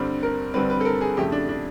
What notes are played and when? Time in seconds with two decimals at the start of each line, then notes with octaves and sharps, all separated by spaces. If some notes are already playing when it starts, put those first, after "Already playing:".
Already playing: G2 D3 G3 C4
0.23 A#4
0.54 G2 D3 G3 C4 B4
0.70 B4
0.81 A4
0.85 A#4
1.01 G#4
1.17 F2 C#3 F3 A3 G4
1.32 D4
1.49 D4